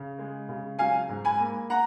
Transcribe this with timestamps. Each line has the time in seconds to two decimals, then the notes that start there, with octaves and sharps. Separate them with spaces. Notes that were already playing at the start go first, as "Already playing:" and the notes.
Already playing: C#3
0.18 G#3
0.49 C#3
0.79 F#3 F5 G#5
1.09 G#2
1.25 G#5 B5
1.40 A#3
1.70 F#5 A#5